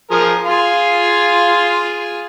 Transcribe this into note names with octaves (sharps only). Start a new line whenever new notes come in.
F3 G#4 A#4
F4 G#4 F5 C6